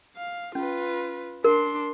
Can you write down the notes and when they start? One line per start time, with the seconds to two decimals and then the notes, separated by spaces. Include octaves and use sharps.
0.17 F5
0.55 C#4 F4 B4
1.44 D4 A#4 C6